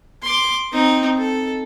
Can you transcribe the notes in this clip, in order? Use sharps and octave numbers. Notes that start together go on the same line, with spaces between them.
C6 D6
C4 D#4
A4